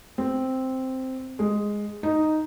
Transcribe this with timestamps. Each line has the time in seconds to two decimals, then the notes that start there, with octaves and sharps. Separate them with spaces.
0.18 C4
1.39 G#3
2.03 D#4